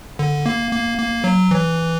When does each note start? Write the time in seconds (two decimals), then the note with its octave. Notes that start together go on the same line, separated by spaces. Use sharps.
0.19 D3
0.46 A#3
0.71 A#3
0.98 A#3
1.24 F#3
1.51 E3